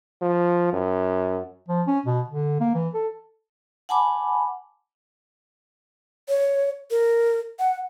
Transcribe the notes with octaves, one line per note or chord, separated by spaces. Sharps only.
F3
F#2
F3
C#4
B2
D3
A#3
E3
A4
F#5 G#5 A5 B5 D6
C#5
A#4
F#5